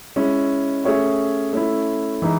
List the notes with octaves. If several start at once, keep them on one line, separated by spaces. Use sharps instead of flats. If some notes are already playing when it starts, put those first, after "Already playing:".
G#3 C#4 E4
A3 C#4 G#4 C#5 E5
A3 C#4 E4
E3 G#3 D#4